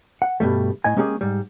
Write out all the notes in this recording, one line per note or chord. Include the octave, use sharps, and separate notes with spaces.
F#5
G2 B2 G3 A3
A2 D#5 G#5
G#3 A#3 C#4 G4 G#4
G#2 G3